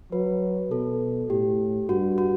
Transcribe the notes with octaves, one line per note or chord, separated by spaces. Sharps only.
F#3 B4
B2 A4
A2 G4
G2 F#4
F#4